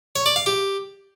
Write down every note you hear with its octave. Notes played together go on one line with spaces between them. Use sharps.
C#5
D5
F5
G4